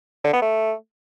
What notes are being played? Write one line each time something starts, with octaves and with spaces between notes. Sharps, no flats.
D3
B3
A3